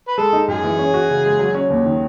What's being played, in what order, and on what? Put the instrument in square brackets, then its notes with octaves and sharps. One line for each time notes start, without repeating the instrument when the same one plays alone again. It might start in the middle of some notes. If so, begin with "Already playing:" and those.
[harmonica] B4
[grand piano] G#3 [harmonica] A4
[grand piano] D#4
[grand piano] F#2 [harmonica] G#4
[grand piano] E3
C#4
F#4
C#3
G#3
F#3
C#4
D#2
D#3